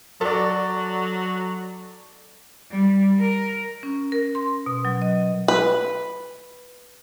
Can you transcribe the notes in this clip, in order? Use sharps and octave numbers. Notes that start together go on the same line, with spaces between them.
F#3 A4 D5
G3
A#4
C#4
A#4
C6
B2
F#3
D#5
B4